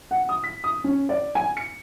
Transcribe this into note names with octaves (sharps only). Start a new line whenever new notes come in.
F#5
D#6
B6
D#6
C#4
D5
G#5
C#7